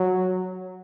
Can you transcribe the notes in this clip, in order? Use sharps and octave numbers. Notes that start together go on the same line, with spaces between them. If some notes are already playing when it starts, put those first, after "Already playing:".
Already playing: F#3